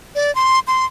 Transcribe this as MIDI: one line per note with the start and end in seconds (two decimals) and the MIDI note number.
0.15 0.34 74
0.35 0.60 84
0.67 0.85 84